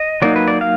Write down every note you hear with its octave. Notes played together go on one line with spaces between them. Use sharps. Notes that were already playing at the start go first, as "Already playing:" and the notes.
Already playing: D#5
F#3 A#3 D#4 D5
B4
D5
F5